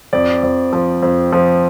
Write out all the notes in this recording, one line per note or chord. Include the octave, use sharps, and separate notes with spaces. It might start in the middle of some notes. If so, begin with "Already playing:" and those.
F2 D5
F2
F3
F2
F3